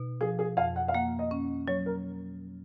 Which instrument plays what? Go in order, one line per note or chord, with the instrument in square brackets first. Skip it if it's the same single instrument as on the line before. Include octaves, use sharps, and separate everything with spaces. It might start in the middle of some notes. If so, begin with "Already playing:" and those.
Already playing: [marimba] B2 D#4
[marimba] F3 [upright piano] G#4
[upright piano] G#4
[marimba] F2 [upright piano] F5
[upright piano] F#5
F5
[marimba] A#3 [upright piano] F#5
[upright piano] D#5
[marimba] C#4
[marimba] F#3 [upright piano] C#5
[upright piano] A#4